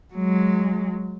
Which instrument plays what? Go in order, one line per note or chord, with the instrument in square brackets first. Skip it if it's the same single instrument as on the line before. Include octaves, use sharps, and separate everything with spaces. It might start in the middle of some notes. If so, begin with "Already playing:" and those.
[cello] F#3 G#3